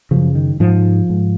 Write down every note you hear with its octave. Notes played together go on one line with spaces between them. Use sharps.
F#2 C#3 F3
D#3
G#2 F3
G#2